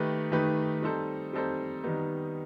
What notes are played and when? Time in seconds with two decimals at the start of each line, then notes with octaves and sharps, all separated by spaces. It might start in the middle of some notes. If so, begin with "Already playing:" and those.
Already playing: D#3 A3 D#4 G4 B4
0.32 D#3 A3 D#4 G4 B4
0.82 G3 C4 D#4 A4 C5
1.33 G3 C4 D#4 A4 C5
1.84 D#3 G3 B3 D#4